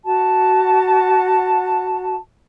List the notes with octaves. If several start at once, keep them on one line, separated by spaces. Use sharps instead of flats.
F#4 A5